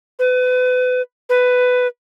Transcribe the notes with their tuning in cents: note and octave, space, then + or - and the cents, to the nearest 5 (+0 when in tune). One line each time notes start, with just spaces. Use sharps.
B4 +35
B4 +10